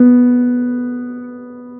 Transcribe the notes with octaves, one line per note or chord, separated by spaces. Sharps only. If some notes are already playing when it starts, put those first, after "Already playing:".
Already playing: B3